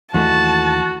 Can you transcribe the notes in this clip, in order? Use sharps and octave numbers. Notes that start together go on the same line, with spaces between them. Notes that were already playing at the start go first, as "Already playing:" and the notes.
D#2 E3 A3 F#4 A5